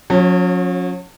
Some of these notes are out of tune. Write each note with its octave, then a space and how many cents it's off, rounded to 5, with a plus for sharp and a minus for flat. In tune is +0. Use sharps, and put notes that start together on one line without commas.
F#3 -45 C#4 -5